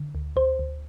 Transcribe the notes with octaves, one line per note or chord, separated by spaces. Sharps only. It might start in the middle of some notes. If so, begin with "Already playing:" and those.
Already playing: D3
D2
D2 C5
D2